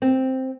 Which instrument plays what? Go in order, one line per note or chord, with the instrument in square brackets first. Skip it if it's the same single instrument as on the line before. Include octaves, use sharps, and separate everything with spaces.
[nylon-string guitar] C4